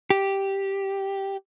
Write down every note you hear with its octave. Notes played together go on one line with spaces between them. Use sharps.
G4